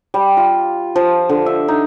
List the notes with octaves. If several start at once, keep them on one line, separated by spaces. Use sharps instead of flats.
G3
F4
F3
D3
E5
D#4